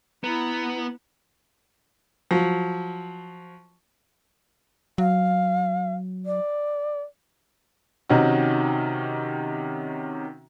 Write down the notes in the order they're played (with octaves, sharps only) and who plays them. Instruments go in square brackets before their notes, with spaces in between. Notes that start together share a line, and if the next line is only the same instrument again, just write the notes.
[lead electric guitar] B3 [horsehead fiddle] E4 A#5
[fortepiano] F3 F#3
[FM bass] F#3 [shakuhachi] F5
[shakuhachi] D5
[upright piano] C3 D#3 C#4 D#4 F#4